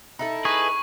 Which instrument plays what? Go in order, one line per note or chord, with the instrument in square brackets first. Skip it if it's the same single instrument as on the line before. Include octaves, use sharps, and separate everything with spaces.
[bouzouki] D#4 E4 A4
[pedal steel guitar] G#4 [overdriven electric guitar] B4 [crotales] C#6